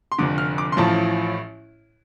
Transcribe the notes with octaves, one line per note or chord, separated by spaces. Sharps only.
C6
F1 F2 D3 D6
F6
D6
C6
A1 A2 F3 A5